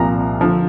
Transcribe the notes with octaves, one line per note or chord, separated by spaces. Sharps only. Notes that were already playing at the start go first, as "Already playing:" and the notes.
Already playing: C2 A#2 F3 A#5
D3 F3